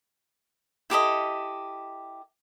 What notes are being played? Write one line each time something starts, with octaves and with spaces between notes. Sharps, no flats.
E4 G4 A4 D#5